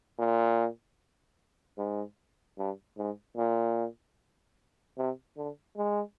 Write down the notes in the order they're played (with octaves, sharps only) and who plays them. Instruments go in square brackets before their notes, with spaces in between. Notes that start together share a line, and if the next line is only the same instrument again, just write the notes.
[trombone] A#2
G#2
G2
G#2
A#2
C3
D3
G#3